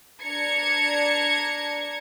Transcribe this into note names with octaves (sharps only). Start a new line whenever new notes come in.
D4 A#5 G#6 C#7